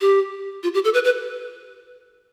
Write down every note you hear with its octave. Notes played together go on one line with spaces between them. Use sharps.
G4
F4
G4
A4
B4
B4